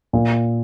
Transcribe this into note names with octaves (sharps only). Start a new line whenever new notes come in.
A#2